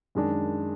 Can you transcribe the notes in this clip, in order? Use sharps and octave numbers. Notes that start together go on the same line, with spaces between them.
F#2 D#3 G#3 D4